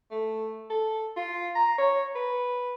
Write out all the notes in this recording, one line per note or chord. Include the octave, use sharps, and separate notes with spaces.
A3
A4
F4
A#5
C#5
B4